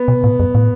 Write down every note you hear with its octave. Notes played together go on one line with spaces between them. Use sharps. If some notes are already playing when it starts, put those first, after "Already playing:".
Already playing: B3
B2
A2
F#2
A2